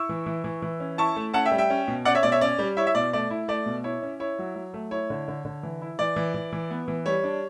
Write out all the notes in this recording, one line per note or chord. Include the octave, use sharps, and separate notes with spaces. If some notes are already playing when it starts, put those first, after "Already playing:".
Already playing: E4 C#6 E6
E3
E3
E3
E3
C#4
E4 A5 C#6
A3
C#4 F#5 A5
E5 G5
G3
E5 G5
C#4
B2
C#4 D5 F#5
C#5 E5
B2 D5
C#5 E5
C#4 D5
G3
E4 C#5 E5
E5
B2 D5
A3 D5
E4
A3 D5
B2
E4 C#5
C#4
E4 C#5
F#3
F#3
A3
E4 C#5
D3
D3
D3
E3
E4
E3 D5
E3
E3
E3
B3
E3
G3 C#5
D4